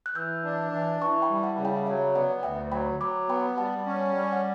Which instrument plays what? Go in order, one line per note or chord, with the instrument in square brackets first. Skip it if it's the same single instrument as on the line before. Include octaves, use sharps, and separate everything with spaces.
[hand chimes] F#6
[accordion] E3 [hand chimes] E6 G6
[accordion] D4
E3
[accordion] E3 [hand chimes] A5 C#6
[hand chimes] G5 B5
[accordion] G3
[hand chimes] F#5 A5
[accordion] C#3
[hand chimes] E5 G5
[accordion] F#3 [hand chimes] C#5 E5
[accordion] B3 [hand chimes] D5 F#5
[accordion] D2 [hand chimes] E5 G5
[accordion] F#3 [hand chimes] G5 B5
[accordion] F#3 [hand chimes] B5 D6
[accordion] B3 [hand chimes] G5 B5
[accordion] G3 [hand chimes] F#5 A5
[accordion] C#4
G3
[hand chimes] F#5